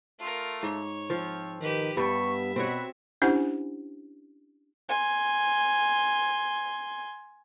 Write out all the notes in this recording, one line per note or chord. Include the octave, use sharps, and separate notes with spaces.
A3 F4 A#4
G#2 C#5
F3 C4 F4
D#3 G4 B4
G2 G3 B3 E5 C#6
B2 C4 F#4 B4 C#5
C#4 D4 E4 G4 C5 F#5
G#5 C6